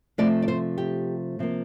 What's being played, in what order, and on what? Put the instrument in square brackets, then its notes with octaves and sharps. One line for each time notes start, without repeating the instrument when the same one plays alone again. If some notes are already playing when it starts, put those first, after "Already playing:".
[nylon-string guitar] C3 F3 A3 D5
D5
C5
G4
C3 F3 A#3